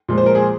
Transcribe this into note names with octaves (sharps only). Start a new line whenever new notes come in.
A#2 F3 G#3
C5
A#4
G#4